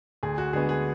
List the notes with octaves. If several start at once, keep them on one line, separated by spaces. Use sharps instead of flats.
D2 G#4
F#4
D3 G#3 B3 G#4
G#4